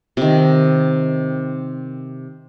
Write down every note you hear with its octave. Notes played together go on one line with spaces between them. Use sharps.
C3 D#3